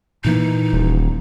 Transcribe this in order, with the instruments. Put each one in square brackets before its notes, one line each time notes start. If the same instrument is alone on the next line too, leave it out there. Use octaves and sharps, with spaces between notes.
[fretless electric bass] A#2 E3 A#3 [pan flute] D#4
[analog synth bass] D#1